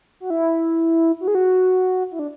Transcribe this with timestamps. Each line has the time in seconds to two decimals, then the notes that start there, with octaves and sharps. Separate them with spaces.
0.20 F#4
0.30 E4
1.21 F#4
1.28 G#4
1.35 F#4
2.12 E4
2.19 D4